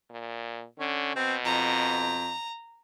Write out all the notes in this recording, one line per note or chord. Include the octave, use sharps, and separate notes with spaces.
A#2
D3 C#4
B2 C4
F2 A#5